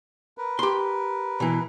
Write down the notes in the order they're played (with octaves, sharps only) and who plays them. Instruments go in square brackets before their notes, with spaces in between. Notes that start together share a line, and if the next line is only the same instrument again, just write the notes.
[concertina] A#4 B4
[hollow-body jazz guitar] G4 C6
B2 E3